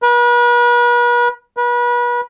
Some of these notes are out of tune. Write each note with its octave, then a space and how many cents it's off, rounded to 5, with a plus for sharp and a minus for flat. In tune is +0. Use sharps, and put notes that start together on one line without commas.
B4 -40
B4 -35